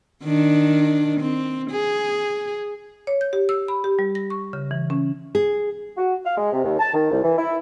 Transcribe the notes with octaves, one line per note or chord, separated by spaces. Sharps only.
D#3 D4
C4
G#4
C#5
G6
G4
E6
B5
G4
G3
A#6
C#6
C#3
E3
C#4
G#4
F#4
F5
G#3
C3
D#2
A5
D#3
C2
E3
E4